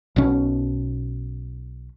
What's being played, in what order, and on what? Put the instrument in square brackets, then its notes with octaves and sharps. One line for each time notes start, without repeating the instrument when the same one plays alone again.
[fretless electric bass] B1 B2 C#4